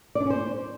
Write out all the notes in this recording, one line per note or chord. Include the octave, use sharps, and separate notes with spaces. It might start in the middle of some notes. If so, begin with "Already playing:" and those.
D5
D4
C#4
C5